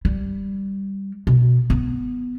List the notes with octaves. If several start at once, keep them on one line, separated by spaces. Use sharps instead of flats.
G3
B2
B3